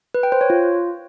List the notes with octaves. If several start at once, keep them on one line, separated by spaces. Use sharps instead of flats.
B4
G5
C5
C#5
F4